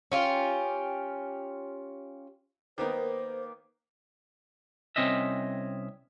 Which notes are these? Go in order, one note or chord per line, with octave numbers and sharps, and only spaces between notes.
C#4 F4 G4
D#3 A#3 B3 D#4 C5
C2 D3 C4 C#4 D#5 E5